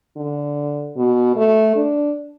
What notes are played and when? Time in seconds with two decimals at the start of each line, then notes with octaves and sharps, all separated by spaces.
0.17 D3
0.97 B2
1.37 A3
1.76 D4